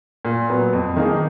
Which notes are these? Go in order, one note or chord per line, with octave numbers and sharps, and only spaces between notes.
A#2
F#3 B3
F2
D#3 A#3 D#4 G#4